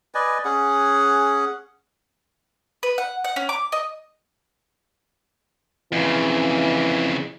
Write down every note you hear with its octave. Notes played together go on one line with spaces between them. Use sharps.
B4 D5 D#5 G#5
C#4 G#4 F#5
B4
F#5
F#5
C#4
D6
D#5
F2 C#3 E3